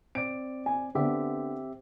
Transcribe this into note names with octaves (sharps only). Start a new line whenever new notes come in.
C4 D5 D7
G#5
D3 B3 C4 G4 E5